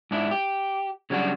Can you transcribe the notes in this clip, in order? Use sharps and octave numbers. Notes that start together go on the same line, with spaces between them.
G#2 D4 E4
G4
C#3 F#3 G3 D4 F#4